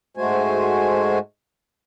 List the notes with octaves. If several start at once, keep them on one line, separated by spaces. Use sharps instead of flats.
G#2 G#3 A3 F#4 C5 G#5